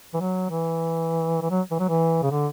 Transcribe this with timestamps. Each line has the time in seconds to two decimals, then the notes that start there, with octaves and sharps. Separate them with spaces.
0.14 E3
0.20 F#3
0.50 E3
1.41 E3
1.50 F#3
1.71 E3
1.79 F#3
1.88 E3
2.22 C#3
2.31 D3